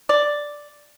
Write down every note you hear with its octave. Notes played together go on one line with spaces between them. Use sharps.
D5